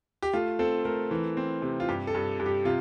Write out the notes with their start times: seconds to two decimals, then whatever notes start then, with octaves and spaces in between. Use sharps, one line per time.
0.22 G4
0.33 A3 F4
0.59 C4 A4
0.85 A3 A#4
1.11 E3
1.37 C4
1.62 C3
1.80 F4
1.88 G2 G4
2.07 A4
2.14 G2
2.40 G2
2.46 G4
2.65 C3 F4